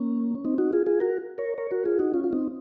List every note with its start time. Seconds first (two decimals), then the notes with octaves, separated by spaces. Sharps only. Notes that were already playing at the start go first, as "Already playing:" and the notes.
Already playing: A#3 C#4
0.35 C#4
0.45 C4 D#4
0.58 D#4 F#4
0.73 F4 G#4
0.86 F4 G#4
1.00 F#4 A#4
1.38 A#4 C#5
1.58 A#4 C#5
1.71 F#4 A#4
1.85 F4 G#4
1.99 D#4 F#4
2.14 C#4 F4
2.24 F4
2.33 C4 D#4